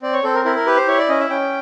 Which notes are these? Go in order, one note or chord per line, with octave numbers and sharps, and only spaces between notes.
C4 D5
C#5
C4 A4
A#4
E4 A#4
A#4
G4 B4
C5
E4 C#5
D5
C#4 D#5
E5
C#4 G5